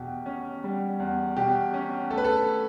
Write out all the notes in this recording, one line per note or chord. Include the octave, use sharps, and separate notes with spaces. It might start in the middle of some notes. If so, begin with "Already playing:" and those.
Already playing: E2 B2 G4
C#4
G3
E2
B2 G4
C#4
A3 A4
B4
A4